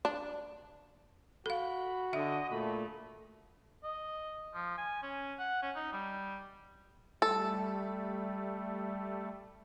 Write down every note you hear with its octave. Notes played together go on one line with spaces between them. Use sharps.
D4
F#4 A4 F5 B5
D3 D#5 E5 F#5
A#2 A3 B5
D#5
F3
G#5
C#4
F#5
C#4
D#4
G3
G3 A3 A4